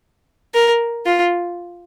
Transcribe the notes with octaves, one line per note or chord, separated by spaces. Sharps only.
A#4
F4